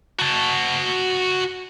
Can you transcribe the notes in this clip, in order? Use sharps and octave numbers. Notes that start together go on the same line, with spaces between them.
F#4 A5